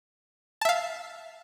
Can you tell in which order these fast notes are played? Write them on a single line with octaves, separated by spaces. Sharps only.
A5 E5 F5